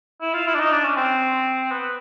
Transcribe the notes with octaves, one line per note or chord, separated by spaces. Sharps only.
E4
F4
E4
D4
D#4
D4
C#4
C4
B3